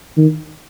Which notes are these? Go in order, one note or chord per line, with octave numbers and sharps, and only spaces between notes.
D#3